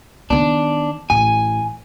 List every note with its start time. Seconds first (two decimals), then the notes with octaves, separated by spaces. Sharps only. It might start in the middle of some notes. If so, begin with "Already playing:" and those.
0.30 D#3 B3 D4
1.10 A1 G#5